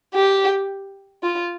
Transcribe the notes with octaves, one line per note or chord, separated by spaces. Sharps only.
G4
F4